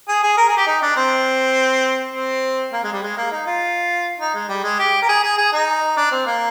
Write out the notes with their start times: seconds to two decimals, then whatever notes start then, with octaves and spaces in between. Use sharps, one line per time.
0.08 G#4
0.23 G#4
0.37 A#4
0.48 G#4
0.57 G4
0.67 D#4
0.82 D4
0.96 C4
2.14 C4
2.73 A#3
2.83 G#3
2.93 G3
3.03 G#3
3.17 A#3
3.32 D#4
3.46 F4
4.20 D#4
4.34 G#3
4.49 G3
4.64 G#3
4.79 G4
5.02 A#4
5.08 G#4
5.23 G#4
5.38 G#4
5.53 D#4
5.97 D4
6.11 C4
6.26 A#3